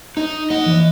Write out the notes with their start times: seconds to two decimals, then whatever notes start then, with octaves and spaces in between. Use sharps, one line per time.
0.17 D#4 D#5
0.50 A#3 D#5 F#5
0.66 E3 D5